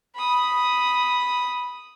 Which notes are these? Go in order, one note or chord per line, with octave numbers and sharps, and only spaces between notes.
B5 D#6